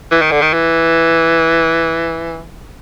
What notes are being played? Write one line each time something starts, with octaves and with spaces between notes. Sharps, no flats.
E3
D#3
D3
D#3
E3